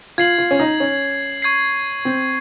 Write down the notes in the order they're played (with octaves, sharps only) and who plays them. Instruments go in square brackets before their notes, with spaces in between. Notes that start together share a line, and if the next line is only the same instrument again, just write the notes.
[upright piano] F4 [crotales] G#6 C7 F#7
[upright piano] F4
C#4
D#4
C#4
[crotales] C#6 G#6 C7
[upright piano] C4